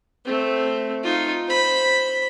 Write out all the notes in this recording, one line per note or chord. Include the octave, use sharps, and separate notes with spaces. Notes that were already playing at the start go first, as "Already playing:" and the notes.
A3 C4
D#4 F4
C5 B5